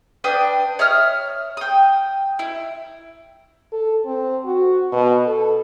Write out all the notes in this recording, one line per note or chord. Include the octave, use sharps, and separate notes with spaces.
D4 B4 G5 D#6
C#5 E5 D#6 F6
G5 D#6
E4
A4
C4
F#4
B2
A4